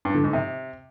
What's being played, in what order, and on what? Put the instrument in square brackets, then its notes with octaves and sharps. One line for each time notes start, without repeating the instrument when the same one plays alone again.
[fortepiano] G2
D3
G#2
C3